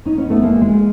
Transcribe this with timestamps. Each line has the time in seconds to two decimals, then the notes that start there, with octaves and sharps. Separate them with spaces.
0.05 C#4 D#4
0.18 B3 C#4
0.30 A3 B3
0.43 G#3 A#3
0.61 G#3